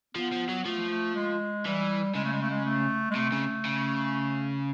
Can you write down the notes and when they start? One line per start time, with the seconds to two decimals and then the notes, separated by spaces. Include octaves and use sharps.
0.15 F3 B3
0.32 F3
0.49 F#3
0.65 F3 A3
0.90 A3
1.15 G#3
1.65 E3 G3
2.15 C#3 G#3
2.24 A3
2.33 G#3
2.41 A3
2.50 G#3
2.65 A3
3.11 G#3
3.15 C3 A3
3.32 C#3
3.65 C#3